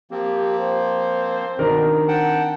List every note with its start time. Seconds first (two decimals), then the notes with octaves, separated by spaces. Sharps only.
0.11 F3 A#3 C4 G4
0.59 C5
1.59 B2 D#3 C4 D4 A#4
2.08 F#5 G5 A5